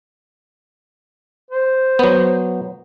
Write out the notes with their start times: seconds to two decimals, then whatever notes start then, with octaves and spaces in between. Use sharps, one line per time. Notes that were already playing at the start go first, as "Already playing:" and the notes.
1.51 C5
1.99 F#3 B3